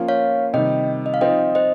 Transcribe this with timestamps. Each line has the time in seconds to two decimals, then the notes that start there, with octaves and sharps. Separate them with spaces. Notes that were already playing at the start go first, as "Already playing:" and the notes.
Already playing: F3 A#3 C#4 F4
0.08 C#5 F5
0.53 C3 D#3 G3 D#5 G5
1.06 D#5
1.14 F5
1.21 F3 C4 D#4 D#5 G5
1.55 C5 D#5